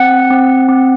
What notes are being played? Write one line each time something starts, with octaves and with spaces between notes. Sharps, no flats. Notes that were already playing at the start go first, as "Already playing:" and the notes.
Already playing: C4 F#5
C4
C4